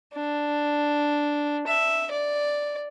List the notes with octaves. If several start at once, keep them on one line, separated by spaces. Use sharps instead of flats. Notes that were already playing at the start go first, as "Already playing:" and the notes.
D4
E5
D5